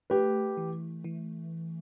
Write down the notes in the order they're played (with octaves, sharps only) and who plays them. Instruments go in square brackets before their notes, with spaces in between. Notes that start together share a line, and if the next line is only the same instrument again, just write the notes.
[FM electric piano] A3 [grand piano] G4 B4
[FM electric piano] E3
E3